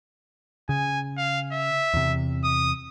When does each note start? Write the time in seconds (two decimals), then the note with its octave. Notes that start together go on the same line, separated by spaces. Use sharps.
0.69 C#3 G#5
1.17 F5
1.52 E5
1.94 E2 C3
2.44 D#6